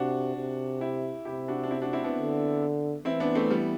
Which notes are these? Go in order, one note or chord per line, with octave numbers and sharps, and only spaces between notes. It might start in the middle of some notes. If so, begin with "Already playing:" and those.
Already playing: C3 D4 F#4
C3
E4 G4
C3 E4 G4
D4 F#4
D4
C4 E4
D4 F#4
C4 E4
B3 D4
D3
E3 C4 E4
B3 D4
A3 C4
G3 B3